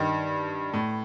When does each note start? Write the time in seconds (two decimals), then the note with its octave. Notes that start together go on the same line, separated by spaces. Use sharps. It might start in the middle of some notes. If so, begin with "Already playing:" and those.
Already playing: G2 D#3
0.73 A2